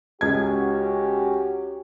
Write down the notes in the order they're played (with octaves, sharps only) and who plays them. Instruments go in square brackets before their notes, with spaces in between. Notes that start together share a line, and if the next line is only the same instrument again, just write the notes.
[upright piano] C#2 G#6 [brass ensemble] C#4 F#4 G4